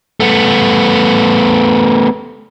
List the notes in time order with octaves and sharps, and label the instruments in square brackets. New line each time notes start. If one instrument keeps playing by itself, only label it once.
[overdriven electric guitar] A3 B3